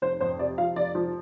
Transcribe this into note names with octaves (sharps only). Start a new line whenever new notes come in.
F1 C5
F2 C5
C3 D5
F3 F5
F1 D5
F3